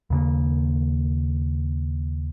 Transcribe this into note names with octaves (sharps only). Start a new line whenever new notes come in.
D#2 C#3 A#3